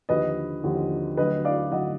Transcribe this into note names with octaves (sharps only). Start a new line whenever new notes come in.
D#2 D3 F3 B4 D#5
D#2 D3 F3
D2 D3 F#3 B4 D#5
D5 F5
D2 D3 F#3 D#5 F#5